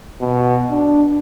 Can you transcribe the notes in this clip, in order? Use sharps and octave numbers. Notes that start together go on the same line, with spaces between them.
B2
D4